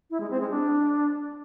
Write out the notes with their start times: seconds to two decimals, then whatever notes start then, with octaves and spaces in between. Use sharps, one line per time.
0.10 E4
0.20 G#3
0.30 C4
0.40 G#3
0.50 D4